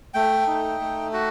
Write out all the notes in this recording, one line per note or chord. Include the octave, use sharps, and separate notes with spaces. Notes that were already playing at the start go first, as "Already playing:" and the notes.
A3 G5
D#4
A3
F#4